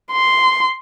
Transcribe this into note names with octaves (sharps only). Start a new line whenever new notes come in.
C6